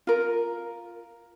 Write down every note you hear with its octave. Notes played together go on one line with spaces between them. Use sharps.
F4 A#4